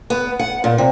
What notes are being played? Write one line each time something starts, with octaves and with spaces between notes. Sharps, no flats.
B3
F#5
A#2
C3